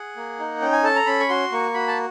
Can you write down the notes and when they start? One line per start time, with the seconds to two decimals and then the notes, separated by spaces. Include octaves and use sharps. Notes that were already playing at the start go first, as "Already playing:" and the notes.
Already playing: G#4 F#5
0.17 A#3
0.39 D#4
0.61 C#4 G5
0.72 G#5
0.83 A4 A5
0.96 A#5
1.06 C#4 B5
1.20 C#6
1.29 F#4 C6
1.52 A#3 C#6
1.74 F#4 B5
1.88 A5